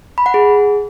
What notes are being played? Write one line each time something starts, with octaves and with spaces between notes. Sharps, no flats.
B5
F#5
G#4